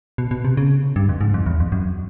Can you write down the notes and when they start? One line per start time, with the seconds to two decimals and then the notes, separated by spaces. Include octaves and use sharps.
0.18 B2
0.31 B2
0.45 C3
0.57 C#3
0.96 G2
1.09 F2
1.21 G#2
1.34 F2
1.46 E2
1.60 F2
1.72 F#2